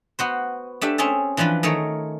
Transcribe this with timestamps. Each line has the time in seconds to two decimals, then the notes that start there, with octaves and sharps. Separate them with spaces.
0.19 B3 F#4 C5
0.81 A3 D4 G4 E5
0.98 C4 C#4 G#4 E5 A5
1.37 E3 F3 D4 F4 B4
1.63 D#3 A3 G#4 A#4 C#5